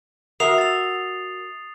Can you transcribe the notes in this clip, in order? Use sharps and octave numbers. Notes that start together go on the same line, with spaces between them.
F#4 A#4 E5 D#6 C7 F7
A6 F7